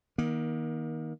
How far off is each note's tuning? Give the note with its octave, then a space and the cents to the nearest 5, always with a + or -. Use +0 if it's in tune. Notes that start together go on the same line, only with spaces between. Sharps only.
D#3 +20 A#3 +35